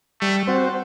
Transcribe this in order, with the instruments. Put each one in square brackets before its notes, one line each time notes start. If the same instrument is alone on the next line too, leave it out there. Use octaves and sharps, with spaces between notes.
[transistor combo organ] G3 [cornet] A3
[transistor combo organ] C4 F#4 C5